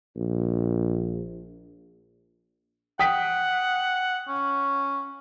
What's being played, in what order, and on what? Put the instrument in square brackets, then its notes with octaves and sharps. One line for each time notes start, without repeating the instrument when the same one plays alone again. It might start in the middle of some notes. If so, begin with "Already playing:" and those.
[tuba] A#1
[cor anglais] F#5 [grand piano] G5 D#6 B6
[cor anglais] C#4